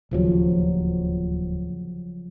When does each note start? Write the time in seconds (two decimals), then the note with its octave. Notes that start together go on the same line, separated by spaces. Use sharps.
0.11 D1 D#2 C#3 F3 F#3